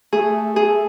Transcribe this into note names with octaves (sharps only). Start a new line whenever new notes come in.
A3 G#4
G#4